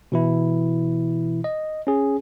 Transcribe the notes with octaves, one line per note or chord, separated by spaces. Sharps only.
B2 E3 E4
D#5
C#4 G#4